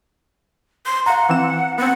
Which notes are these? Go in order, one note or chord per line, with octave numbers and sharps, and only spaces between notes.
C6
F5 F#5 A#5
E3 C4 E7
B3 C4 F#5